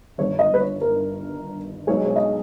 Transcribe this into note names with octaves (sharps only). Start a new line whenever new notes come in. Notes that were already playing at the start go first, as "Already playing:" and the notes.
G1 G2 D#3 C#5
D#5
B4
C#5
A#4
B1 B2 G#3 C#4 G#4 C#5
C#5
D#5